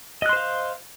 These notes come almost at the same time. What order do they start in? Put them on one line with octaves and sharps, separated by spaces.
D#5 F#6 C6 C5 F5